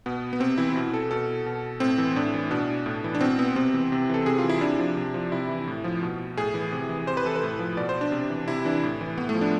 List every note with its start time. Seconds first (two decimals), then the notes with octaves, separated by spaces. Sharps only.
0.06 B2 B3
0.33 B3
0.40 C3 C4
0.58 E3 E4
0.76 B2
0.94 A4
1.11 B2 A4
1.46 B2
1.80 A2 C4
1.98 E3
2.16 A2 D4
2.34 E3
2.51 B2 D4
2.86 A2
3.04 E3
3.15 D4
3.21 B2 C4
3.39 B3
3.56 C3 C4
3.74 E3
3.92 C3
4.09 E3 A4
4.26 C3 G#4
4.38 F4
4.44 E3
4.49 E4
4.61 C3 D4
4.79 F3
4.97 C3
5.14 F3
5.32 C3 E4
5.49 E3
5.67 A2
5.84 F3
6.03 B2
6.37 A2 G#4
6.54 E3
6.72 C3
6.89 E3
7.07 C3 C5
7.17 B4
7.25 E3 A4
7.36 B4
7.43 A2
7.59 F3
7.77 B2 D5
7.89 C5
8.01 D4
8.12 C3
8.30 E3
8.48 C3 E4
8.65 E3 D4
8.83 A2
9.01 E3
9.18 A2 B3
9.29 A3
9.35 F3
9.41 D4